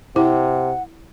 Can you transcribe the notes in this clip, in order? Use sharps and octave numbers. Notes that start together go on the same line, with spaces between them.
C3 E4 C5 F#5